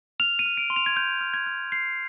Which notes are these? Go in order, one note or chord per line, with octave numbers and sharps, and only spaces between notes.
F6 F7
D#7
F6
D7
C6
F7
G#6
F6 G6
F6
G#6
F6
G6 C7